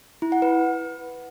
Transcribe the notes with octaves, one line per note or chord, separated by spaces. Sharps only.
E4
F#5
B4